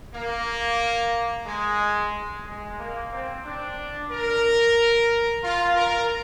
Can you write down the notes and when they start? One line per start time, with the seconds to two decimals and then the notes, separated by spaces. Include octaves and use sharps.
0.14 A#3
1.46 G#3
2.45 G#3
2.78 A#3
3.12 C4
3.45 D4
4.11 A#4
5.43 F4
5.76 A#4